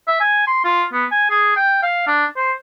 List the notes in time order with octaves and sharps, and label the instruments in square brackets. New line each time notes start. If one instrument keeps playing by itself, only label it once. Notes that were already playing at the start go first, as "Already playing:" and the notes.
[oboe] E5
G#5
C6
F4
B3
G#5
G#4
G5
F5
D4
C5